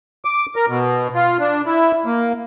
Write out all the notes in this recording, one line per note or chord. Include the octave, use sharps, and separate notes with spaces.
D6
A#4
B2
F4
D4
E4
A#3